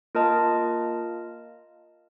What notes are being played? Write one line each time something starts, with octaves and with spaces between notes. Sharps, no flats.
A#3 F4 A#4 D#5 A5